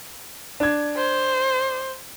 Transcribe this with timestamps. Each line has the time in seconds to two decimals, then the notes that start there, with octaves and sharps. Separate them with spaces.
0.60 D4 G#6
0.97 C5